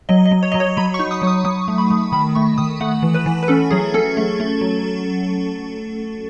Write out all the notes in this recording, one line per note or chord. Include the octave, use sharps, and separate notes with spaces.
F#3 D#5
D#5
F#3
C#5
F#3 D#5
C#5
F#3 B5
C#6
D#4
D#6
F#3
D#6
F#3 D#6
A3
B5
A3
D#3 B5
A3 C#6
D#3 D#6
A3 F#5
E3
B4
E3
B4
C#4 A4
F#3 G#4
C#4 A4
A3
A3
F#3